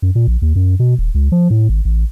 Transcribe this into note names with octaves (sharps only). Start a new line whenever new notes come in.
F#2
A#2
A#1
D#2
F#2
B2
D#1
C#2
F3
A2
G#1
A1